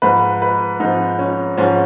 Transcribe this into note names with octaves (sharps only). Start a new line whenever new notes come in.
G#2 F3 B4
B4
G#2 F3 D#4
C#4
G#2 F3 C#4